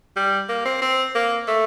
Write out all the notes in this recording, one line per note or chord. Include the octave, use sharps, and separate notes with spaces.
G3
A#3
C4
C4
A#3
A3